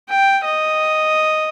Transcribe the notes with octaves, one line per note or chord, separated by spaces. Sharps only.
G5
D#5